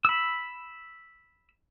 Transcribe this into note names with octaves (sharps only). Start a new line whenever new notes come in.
B5 E6